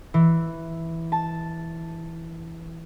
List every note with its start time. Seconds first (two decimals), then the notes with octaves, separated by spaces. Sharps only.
0.14 E3
1.12 A5